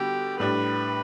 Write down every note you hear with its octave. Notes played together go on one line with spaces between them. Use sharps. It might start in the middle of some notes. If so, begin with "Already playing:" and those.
Already playing: D3 G3 B3 F#4 G4
A2 G3 D4 B4